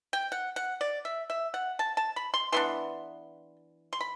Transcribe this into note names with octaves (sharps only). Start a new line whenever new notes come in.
G5
F#5
F#5
D5
E5
E5
F#5
A5
A5
B5
C6
E3 B3 D4 C6
C6
B5